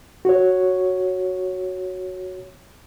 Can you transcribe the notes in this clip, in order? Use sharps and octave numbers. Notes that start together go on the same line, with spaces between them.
F#4 C#5